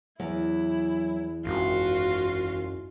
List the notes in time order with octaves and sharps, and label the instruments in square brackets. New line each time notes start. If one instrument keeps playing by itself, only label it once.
[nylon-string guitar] E2 [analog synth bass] F#3 [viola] E4
[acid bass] G#1 [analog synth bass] F#2 [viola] F4 F#4